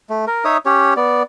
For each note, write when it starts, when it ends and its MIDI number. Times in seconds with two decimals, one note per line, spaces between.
0.10 0.25 57
0.27 0.44 70
0.45 0.57 63
0.45 0.57 73
0.45 0.57 76
0.45 0.57 87
0.66 0.94 61
0.66 0.94 67
0.66 0.94 73
0.96 1.23 59
0.96 1.23 74